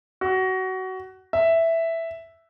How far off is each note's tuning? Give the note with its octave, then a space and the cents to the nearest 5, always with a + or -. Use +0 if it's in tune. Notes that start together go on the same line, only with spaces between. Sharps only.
F#4 +20
E5 +0